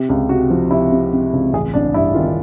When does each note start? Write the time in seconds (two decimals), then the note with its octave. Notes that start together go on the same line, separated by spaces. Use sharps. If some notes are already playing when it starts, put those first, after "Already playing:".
Already playing: C3
0.09 C#2 G4
0.29 C3 F#4
0.50 F3 F4
0.70 C3 E4
0.92 C3
1.13 C3
1.33 C#2
1.53 A1 G#4
1.74 A1 D4
1.94 G2 E4
2.14 D#3 F4